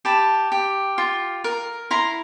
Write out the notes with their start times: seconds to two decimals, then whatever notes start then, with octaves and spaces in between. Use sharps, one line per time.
0.05 G4 A5 B5
0.52 G4
0.98 F4
1.44 A#4
1.91 E4 A#5 C6